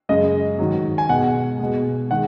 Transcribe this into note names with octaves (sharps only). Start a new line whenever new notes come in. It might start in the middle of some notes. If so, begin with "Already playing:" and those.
F#2 C#3 G#3 D#5
G#2 D#3 F#3
G#5
B2 G#3 F#5
B2 G#3
D#3 G#3 F#5